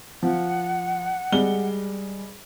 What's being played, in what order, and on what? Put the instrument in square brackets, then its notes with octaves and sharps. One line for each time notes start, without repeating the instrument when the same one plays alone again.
[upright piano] F3 [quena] F#5
[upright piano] G3 G#3 G7